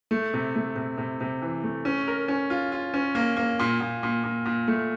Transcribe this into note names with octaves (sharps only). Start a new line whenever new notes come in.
A3
C3
A3
C3
C3
C3
E3
A3
C#4
A#4
C#4
F4
F4
C#4
A#3
A#3
A#2
A#2
A#2
A#2
A#2
A3